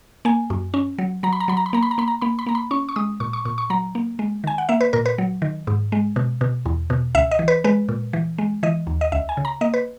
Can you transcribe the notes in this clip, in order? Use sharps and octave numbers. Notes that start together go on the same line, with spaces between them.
A#3 G#5
F#2
C#4
F#3
F#3 A#5
B5
A#5
F#3 B5
A#5
B5
A#3 A#5
B5
A#5
A#3 B5
A#5
A#3 B5
B5
A#3 A#5
B5
C#4 C#6
C#6
G#3 D#6
A#2 C#6
C#6
A#2 C#6
C#6
F#3 A#5
A#3
G#3
D#3 G#5
F#5
A#3 E5
B4
A#2 A#4
B4
F#3
D#3
G#2
G#3
B2
B2
E2
B2
C#2 E5
D#5
E3
B4
G#3 B4
A#2
E3
G#3
E3 D#5
D#2
D#5
C#2 E5
G#5
C#3
A#5
A#3 D#5
B4